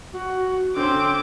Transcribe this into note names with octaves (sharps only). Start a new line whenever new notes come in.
F#4
D3 C4 C#4 C6 D6